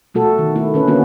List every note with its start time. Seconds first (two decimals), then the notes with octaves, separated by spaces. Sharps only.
0.14 B2 A3 F#4 A4
0.38 D#3
0.56 A3 E4
0.74 D3 C#4 B4
0.87 A#3 B3 C#4 F#4